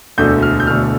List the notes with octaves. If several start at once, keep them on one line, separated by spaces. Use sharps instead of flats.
E1 D2 D3 A3 G6
F6
G6
E1 D2 D3 A3 F6